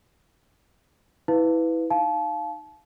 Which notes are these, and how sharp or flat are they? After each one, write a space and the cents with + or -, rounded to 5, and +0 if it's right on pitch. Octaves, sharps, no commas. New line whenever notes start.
E4 -15 B4 +15 F5 +0
D#4 +0 F5 +0 A5 -35